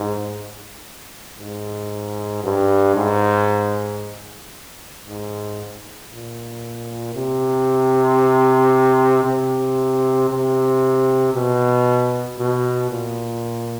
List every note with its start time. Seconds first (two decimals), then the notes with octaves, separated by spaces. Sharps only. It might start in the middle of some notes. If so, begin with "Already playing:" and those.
Already playing: G#2
1.39 G#2
2.44 G2
2.96 G#2
5.06 G#2
6.10 A#2
7.15 C3
9.24 C3
10.29 C3
11.34 B2
12.39 B2
12.91 A#2